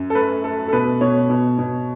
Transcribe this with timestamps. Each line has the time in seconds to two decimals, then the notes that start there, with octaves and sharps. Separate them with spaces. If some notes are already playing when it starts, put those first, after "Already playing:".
Already playing: F#2
0.10 A4
0.15 A3 B4
0.44 A3 A4
0.68 A4
0.73 B2 B4
1.01 B2 C#5
1.30 B2
1.59 B2